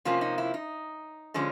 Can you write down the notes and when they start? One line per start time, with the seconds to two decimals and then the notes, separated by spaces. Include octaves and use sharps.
0.05 C3 F3 A#3 C#4 F4
0.21 D#4
0.38 E4
0.54 D#4
1.34 D3 F3 G#3 C#4